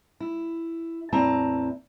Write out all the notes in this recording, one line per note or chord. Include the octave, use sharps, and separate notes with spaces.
E4
E2 A2 C4 E4 A5 A#5